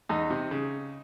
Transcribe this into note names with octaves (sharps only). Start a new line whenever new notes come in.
E2 D#4
C3
C#3